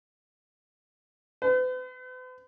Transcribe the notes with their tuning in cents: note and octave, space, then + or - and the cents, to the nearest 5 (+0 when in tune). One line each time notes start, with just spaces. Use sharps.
B4 +45